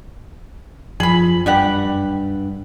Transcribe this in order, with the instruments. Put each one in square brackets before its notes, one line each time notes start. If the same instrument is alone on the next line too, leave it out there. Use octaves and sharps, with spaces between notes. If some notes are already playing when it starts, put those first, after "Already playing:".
[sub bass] F#2 [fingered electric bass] F3 [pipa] G#4 B5
[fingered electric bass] G2 [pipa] G3 G4 F#5